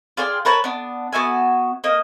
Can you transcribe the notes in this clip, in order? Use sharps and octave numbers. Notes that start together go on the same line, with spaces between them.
F4 G#4 D5 G5
A#4 B4 C#5 A5
B3 D4
B3 F#4 E5 G#5
A#3 D#5